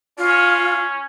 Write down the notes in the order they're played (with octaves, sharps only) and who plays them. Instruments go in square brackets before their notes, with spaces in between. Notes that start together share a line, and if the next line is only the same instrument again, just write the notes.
[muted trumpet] C#4 [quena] F4